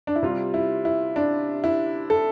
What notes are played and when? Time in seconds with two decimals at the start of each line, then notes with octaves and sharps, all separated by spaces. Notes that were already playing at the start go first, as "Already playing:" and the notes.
0.07 D4
0.16 E4
0.23 C3 G3 F4
0.54 E4
0.85 E4
1.16 D4
1.64 E4
2.10 A4